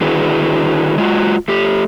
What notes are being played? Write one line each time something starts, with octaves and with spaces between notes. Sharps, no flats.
D3 D#3 E4 F#4 G#4 B4
G#3 F4 F#4
A3 G4